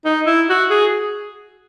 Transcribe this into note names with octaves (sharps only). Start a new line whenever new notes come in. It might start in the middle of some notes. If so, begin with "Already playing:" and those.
D#4
E4
F#4
G#4